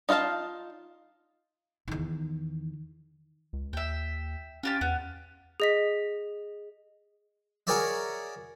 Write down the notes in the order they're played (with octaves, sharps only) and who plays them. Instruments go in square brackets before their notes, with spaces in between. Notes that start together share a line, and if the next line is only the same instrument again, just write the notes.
[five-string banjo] D#4 F4 A4 F5 A5
[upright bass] E2 D#3
[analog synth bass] C#2
[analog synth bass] D#2 [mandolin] E5 G5
[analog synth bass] C#4 [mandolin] F4 G4 A5
[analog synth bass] E2 [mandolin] B3
[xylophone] G#4 D#5 B6
[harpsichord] F#4 G#4 A#4 C#5 D5 E5